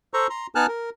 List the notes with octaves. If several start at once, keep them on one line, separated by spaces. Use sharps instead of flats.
A4 C5 A#5 C#6
A#5 C6
B3 D#4 G#5 A5 F6 F#6
A#4